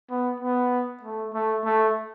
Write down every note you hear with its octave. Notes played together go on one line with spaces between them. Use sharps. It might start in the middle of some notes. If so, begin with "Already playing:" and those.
B3
B3
A3
A3
A3